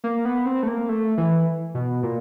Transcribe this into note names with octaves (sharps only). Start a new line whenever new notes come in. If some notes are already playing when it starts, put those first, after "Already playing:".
A#3
B3
C4
A3
A#3
A3
E3
B2
A#2